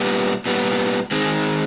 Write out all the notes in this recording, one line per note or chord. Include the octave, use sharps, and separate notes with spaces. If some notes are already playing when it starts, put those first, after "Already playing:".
Already playing: A#2 G3 B3
A#2 G3 B3
D#3 G#3 C4